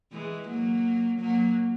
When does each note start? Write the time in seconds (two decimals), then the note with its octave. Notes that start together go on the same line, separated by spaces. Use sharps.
0.12 E3 G#3
0.48 F#3 A#3
1.20 F#3 A#3